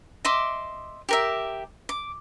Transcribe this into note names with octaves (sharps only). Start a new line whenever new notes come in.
D#5 E5 C6 D6
G4 A#4 E5
D6